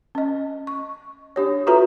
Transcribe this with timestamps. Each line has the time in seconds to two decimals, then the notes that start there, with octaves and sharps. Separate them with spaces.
0.15 C#4 D#5
0.67 C#6
1.36 D4 G4 C#5
1.67 F4 F#4 A4 B4 E5 A#5